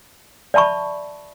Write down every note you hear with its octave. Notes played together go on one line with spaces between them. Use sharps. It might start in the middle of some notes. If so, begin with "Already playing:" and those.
D5 E5 A5 B5 C#6